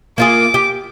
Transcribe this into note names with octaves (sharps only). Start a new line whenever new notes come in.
A#3 F4 G#4 D6
G4